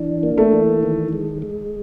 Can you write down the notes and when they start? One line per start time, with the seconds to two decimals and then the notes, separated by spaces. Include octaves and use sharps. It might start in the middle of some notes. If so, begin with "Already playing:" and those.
Already playing: E3 D4
0.23 A#3
0.38 A3
0.53 E3
0.83 D#3
1.13 G#3
1.42 G#3